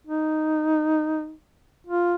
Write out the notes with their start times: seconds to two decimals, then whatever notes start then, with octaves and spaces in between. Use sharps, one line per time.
0.07 D#4
1.87 F4